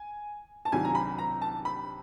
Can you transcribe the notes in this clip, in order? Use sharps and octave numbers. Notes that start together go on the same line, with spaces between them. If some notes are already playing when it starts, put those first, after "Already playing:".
Already playing: G#5
A5
C2 C3 D#3 F#3 G#5
A#5
B5
A#5
A5
B5